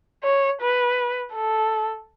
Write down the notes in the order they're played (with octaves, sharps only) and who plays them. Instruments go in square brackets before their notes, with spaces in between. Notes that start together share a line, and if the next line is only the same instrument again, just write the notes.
[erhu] C#5
B4
A4